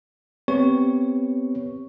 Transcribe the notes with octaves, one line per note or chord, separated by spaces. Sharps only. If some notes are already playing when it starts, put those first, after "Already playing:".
B3 C4 G4 B4 C#5 C#6